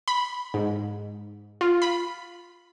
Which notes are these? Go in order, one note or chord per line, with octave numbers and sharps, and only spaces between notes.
B5
G#2
F4
B5